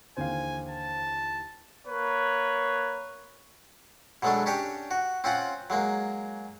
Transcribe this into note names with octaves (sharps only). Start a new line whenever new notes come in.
D#2 D3 E3 C5 F5 G#5
A5
A#3 B4 C#5
B2 F#3 G#3 A3 D4
C#4 D4 G4 C#5
F#4
C4 C#4 F4 F#5
F#3 G#3 A#3